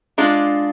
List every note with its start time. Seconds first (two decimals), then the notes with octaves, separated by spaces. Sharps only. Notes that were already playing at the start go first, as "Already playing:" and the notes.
0.18 G#3 D4 F4